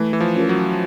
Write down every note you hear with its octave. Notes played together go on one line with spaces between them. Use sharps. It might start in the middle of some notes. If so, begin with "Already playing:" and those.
Already playing: E3 A3
E3
F3
C#4 F4 A#4
F#3